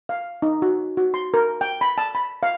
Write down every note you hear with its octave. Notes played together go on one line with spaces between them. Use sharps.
F5
D#4
F#4
F#4
C6
A#4
G5
B5
A5
B5
F5